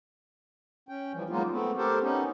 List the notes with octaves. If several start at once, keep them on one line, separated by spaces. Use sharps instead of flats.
C#4 G5
E3 F3 G3
F#3 G#3 A#3 B3 D#4 F4
A3 B3 C4
G4 A4 A#4 C5
B3 C#4 D#4